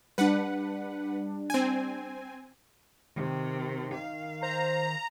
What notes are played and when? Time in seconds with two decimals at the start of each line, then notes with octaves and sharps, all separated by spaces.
0.18 G3 D4 B4 F#5
1.50 C4 G#5
3.16 C3 D#3
3.94 F5
4.42 C5 A#5